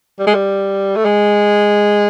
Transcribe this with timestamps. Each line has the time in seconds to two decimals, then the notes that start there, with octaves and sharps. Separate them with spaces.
0.19 G3
0.27 G#3
0.34 G3
0.96 A3
1.05 G#3